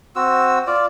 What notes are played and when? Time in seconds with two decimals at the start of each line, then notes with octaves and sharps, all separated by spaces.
0.16 C4 F#4 E6
0.67 F4 D5